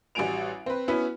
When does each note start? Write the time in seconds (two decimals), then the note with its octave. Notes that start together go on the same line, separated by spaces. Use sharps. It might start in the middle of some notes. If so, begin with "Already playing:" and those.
0.15 A1 G3 F#4 G#5 D7 F7
0.66 C4 B4
0.88 B3 C#4 E4 F#4 B4